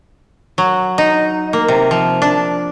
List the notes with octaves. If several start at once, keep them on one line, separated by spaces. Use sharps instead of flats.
F#3
D#4
A#3
C3
F3
D4